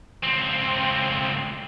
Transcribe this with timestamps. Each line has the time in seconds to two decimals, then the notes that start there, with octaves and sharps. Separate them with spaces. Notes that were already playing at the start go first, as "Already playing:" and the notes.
0.23 C#2 C4